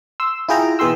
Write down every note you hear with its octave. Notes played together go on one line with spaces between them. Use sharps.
C6 E6
E4 F4 G#4 G5 A#5
B2 E3 G#4 G5 C6 E6